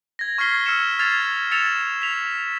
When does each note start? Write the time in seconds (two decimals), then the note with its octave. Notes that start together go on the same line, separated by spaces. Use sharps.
0.19 G#6 A#6
0.38 C#6 F6 G#6 B6 C7 G7
0.66 E6 F6 G#6 C#7 E7
0.99 F6 G#6 A6 C7 F7
1.51 E6 A6 C#7 E7 F7
2.02 B6 F7